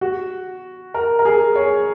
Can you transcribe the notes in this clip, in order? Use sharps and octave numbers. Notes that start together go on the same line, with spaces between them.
F#4
A#4
A#4
G#4
C#5